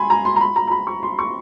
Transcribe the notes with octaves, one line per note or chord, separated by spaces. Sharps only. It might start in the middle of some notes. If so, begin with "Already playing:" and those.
Already playing: G#5 B5 C6
A#5
C6
A#5
B5
A#5
A#5
B5
C#6
C6
C#6